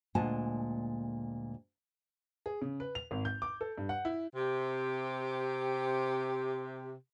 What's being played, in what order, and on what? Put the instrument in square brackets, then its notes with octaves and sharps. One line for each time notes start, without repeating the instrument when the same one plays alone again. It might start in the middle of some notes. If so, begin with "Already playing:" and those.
[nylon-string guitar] D2 A#2 G#3 F#5 G#5 A5
[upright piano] G#4
C#3
B4
F7
G#1
G6
D6
A4
G2
F#5
E4
[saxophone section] C3 G4